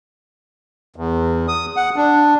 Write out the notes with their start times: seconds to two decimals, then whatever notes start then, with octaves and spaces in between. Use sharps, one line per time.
0.96 E2
1.48 D#6
1.77 F#5
1.96 D4